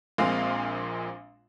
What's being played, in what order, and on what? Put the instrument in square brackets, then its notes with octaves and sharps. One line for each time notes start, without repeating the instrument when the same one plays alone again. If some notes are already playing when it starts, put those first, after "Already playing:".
[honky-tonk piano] A#1 A#2 G#3 C4 F5